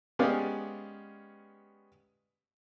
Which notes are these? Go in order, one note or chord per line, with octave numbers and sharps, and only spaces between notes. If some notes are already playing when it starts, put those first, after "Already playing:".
G#3 B3 C#4 G4 D5 F5